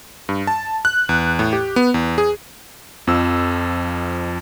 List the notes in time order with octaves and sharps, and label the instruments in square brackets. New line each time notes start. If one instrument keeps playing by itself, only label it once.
[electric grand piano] G2
A5
F#6
E2
A2
G4
B3
E2
G#4
F2 F3 E6